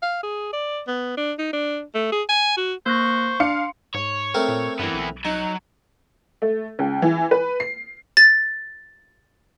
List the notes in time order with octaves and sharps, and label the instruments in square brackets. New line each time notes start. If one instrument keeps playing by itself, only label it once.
[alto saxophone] F5
G#4
D5
B3
D4
D#4
D4
A3
G#4
G#5
F#4
[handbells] A#3 F#6 A#6 [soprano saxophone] C5 [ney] C#6
[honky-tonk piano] D4 F5 C#7 [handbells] C6
[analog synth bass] G#2 [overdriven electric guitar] C#5
[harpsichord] A3 C4 A#4
[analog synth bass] A#2
[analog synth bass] G2 [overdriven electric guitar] E3 B3
[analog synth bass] B1
[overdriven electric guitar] F#3 [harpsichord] D#4
[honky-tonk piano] A3
C#2
E3
B4
C7
[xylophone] A6